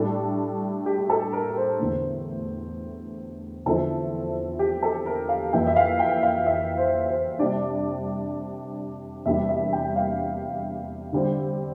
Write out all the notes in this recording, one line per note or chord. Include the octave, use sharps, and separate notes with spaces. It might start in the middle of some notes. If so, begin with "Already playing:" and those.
Already playing: A2 G3 D4 A4
G4
G4
A4
A#4
A#4
C5
E2 D3 A3
E2 D3 F3 C4 E4 A4
G4
A4
A#4
F5
F2 E3 A#3 E4 G5
E5
F5
G5
F5
E5
C5
C5
C3 G3 D4 D5
E2 C3 G3 A#3 D4 E5
E5
G5
F5
D3 G3 C4